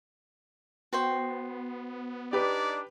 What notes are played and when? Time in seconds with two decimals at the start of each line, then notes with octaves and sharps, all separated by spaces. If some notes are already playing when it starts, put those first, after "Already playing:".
0.93 B3 F#4 C5 G5
2.33 D4 D#4 G4 B4 D5